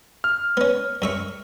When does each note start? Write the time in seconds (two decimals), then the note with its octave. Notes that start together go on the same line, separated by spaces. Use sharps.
0.24 F6
0.57 B3 C#4
1.02 F#2 E5 C#6